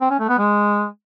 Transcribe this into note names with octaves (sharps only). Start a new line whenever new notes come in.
C4
C#4
A3
B3
G#3